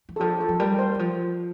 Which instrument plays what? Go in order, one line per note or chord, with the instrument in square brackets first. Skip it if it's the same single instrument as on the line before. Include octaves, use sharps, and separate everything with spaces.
[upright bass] E3
[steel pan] A4
[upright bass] F3 [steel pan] G4
[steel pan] A4
[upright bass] F3
[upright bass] G3 [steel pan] A#4
[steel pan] C5
[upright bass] E3
F3